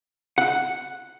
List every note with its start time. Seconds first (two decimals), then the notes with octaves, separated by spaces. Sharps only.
0.38 F#5